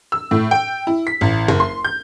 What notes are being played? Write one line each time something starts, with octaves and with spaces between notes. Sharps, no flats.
E6
A2
G5
E4
B6
A1
F#1
C6
G6